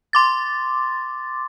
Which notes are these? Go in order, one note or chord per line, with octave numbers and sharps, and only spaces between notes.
C6 D6 A6